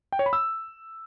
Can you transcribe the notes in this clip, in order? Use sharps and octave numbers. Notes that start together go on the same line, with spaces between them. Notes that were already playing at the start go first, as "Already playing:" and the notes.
G5
C#5
B5
E6